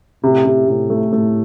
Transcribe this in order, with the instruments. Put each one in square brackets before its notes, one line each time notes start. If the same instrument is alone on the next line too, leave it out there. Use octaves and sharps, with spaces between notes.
[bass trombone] A2 [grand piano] C3
[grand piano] C3
[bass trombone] A2 [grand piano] C3
[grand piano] A3
[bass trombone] A2 [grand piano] A3